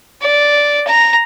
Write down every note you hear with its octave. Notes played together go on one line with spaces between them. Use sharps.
D5
A#5